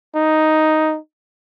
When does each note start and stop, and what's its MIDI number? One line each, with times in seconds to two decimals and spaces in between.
0.15 0.97 63